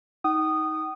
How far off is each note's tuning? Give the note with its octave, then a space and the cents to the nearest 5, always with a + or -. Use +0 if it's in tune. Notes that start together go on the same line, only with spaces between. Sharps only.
D#4 +20 G5 -45 D#6 -15